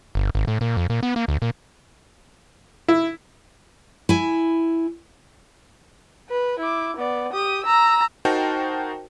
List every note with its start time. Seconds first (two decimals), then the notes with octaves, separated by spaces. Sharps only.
0.15 G1
0.35 G#1
0.47 A2
0.61 A#2
0.77 F2
0.90 A#2
1.03 B3
1.16 A#3
1.28 D2
1.42 A#2
2.88 E4
4.09 E4 G#5
6.30 B4
6.59 E4 D6
6.97 B3 D5
7.33 G4 D#6
7.64 A#5 E6
8.25 D#4 F#4 A#4 C5 G5 A5